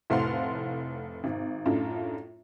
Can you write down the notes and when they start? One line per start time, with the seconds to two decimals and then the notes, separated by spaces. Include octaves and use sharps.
0.10 F1 A2 C5 F5 F#5 C6
1.24 G#1
1.66 F#2 A2 D4 F4